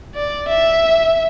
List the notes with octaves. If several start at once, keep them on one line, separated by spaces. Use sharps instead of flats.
D5
E5